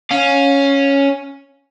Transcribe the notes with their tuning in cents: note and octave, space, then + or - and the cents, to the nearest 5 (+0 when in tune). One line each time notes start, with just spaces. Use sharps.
C#4 +0 F5 +30